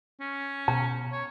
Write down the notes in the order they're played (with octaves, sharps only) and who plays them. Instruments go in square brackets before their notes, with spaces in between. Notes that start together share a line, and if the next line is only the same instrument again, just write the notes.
[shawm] C#4
[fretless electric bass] B2 [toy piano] A#5
[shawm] C#5